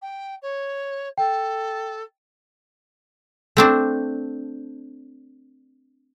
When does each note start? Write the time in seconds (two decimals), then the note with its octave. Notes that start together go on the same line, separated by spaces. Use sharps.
0.02 G5
0.42 C#5
1.18 A4 G5
3.57 A3 C4 D4